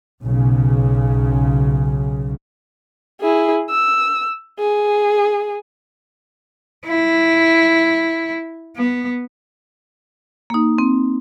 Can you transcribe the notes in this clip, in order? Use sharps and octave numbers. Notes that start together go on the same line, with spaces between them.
B1 C#3
E4 G#4
E6
G#4
E4
B3
A#3 D#4
C4